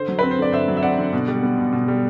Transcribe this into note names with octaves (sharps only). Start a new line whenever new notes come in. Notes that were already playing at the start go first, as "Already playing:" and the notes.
Already playing: D3 C5
F#3
C4 B4
C5
D3 D5
D3 C5 E5
F#3
E5
C4 D5 F#5
D3
B2
G3
B3
B2
B2
G3